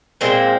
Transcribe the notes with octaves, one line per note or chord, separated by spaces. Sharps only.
A#2 G#3 C4